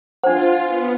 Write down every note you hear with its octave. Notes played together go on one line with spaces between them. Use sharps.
D4 F4 C5 F#5
B3